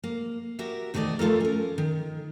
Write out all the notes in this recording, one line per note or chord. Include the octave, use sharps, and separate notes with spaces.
A#3
F#4 G4 A#4 E5
E2 D#3 A3 C5 D5 D#5
A3 F4 A4 A#4
C#4 A#4
D#3